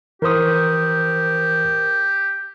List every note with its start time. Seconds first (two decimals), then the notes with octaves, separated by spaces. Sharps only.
0.22 E3 G4 A#4 C5 C#6 D#6